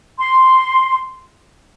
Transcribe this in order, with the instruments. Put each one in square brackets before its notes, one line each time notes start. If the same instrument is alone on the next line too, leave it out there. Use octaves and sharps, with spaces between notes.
[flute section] C6